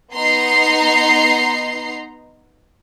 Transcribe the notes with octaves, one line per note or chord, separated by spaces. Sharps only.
B3 D#4 A#5 C6 C7